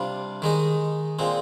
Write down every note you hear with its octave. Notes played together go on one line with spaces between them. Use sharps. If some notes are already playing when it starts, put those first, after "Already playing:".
Already playing: C3 G3 D4 F4
D#3 G#3 D#4
A#2 G#3 C4